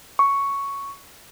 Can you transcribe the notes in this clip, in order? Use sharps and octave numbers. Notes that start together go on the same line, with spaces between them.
C#6